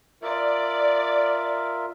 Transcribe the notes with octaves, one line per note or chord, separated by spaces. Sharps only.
F4 A#4 D5 E5